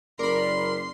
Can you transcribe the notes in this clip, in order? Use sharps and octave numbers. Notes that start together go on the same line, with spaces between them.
F#1 A#4 D5 B5 C6